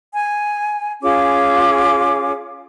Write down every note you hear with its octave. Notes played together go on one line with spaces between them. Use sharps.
G#5
C#4 F4 G#4 D6